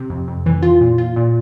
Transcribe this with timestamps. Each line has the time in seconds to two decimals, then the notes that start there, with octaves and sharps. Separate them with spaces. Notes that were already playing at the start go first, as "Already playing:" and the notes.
Already playing: C3
0.10 F2
0.28 F2
0.46 E3
0.62 F4
0.81 A#2
0.98 F4
1.16 A#2